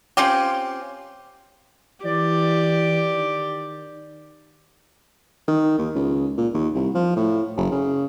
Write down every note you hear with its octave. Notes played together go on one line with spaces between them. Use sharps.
C4 C#4 F4 G4
E3 G4 D5
D#3
D#3
D#2
C#2
A#2
D#2
C2
F3
A2
F#1
C#3